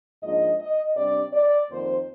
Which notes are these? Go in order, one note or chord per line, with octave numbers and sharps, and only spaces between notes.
G#2 F3 A#3 D4 D#5
D#5
C3 G3 D4 D5
D5
F2 D#3 A#3 C5